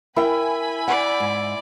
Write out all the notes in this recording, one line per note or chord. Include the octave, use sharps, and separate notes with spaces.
E4 A#4 G5 G#5 B5
D5 F#5
G#2